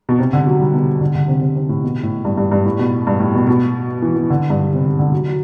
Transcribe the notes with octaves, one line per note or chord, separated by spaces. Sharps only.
B2
C3
D3
F#3
G3
B2
D3
D3
C3
C3
C3
A2
B2
A2
G2
G2
G2
A2
B2
G2
A2
B2
B2
E3
E3
D3
G2
C3
D3
D3
F#3
F#3